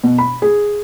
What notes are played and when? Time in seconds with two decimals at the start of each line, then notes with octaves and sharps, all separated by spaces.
0.04 B2
0.18 B5
0.42 G#4